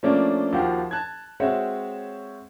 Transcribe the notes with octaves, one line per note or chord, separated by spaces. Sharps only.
F3 A3 A#3 C#4 D4
D#2 F3 F#4 G4 F5
A5 F#6 G#6
G#3 C4 F#4 C#5 E5